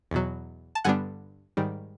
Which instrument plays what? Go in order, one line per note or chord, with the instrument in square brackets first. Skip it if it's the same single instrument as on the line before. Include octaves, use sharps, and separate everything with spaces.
[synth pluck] E2 B2 F#3
A5
G2 D3 G3 B3 D4 F#5 G#5
G#2 D#3 G3